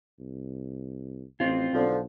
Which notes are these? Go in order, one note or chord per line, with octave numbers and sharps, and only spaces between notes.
C2
A1 C4 F4
B1 D3 F3